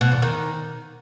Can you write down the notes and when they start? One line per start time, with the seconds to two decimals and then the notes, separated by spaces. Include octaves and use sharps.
0.01 B2
0.12 E2
0.22 D#3